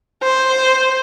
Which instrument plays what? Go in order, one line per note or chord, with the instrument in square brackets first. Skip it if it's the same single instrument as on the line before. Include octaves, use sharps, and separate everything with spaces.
[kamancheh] C5